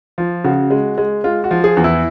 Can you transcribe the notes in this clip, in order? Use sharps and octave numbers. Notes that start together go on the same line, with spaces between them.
F3
C#3 F#4
G#3
G#3
G#3 F4
F#4
F3
G#4
E2
E4